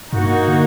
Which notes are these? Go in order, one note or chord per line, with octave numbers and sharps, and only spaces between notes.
G2 A#3 D#4 F#4
D3